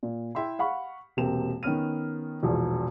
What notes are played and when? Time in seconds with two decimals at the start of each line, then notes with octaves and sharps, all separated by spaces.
0.03 A#2
0.35 E4 E5 G5 C6
0.59 F5 F#5 B5 C#6
1.17 E1 C3 A#3 C4 E7
1.63 D#3 B3 C#4 F6 D#7
2.43 E1 A#1 E2